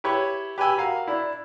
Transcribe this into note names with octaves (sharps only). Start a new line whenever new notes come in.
E4 G4 B4 C#5
G4 B4 G5 G#5 E6
F#4 A#4 F5
D4 E4